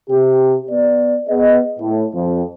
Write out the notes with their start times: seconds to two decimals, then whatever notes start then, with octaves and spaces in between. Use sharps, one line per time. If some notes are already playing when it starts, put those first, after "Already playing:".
0.10 C3 G4
0.69 B3 D5
1.28 B3 G#4 D#5
1.79 A2
2.14 F2